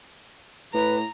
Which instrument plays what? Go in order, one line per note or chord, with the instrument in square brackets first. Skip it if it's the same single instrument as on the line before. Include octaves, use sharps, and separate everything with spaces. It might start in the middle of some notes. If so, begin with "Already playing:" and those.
[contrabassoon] A2 [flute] B4 [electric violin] A#5